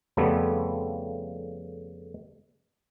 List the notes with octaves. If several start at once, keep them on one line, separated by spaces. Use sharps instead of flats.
F2 C#3 F3 G3 A3 B3